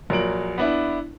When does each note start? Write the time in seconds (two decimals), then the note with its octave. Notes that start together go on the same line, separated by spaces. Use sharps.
0.10 A#1 F#3 A#4 D7 F#7
0.58 B3 D4 E4